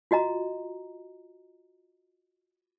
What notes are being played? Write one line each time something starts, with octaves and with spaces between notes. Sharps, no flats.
F4 F#4 D#5 A#5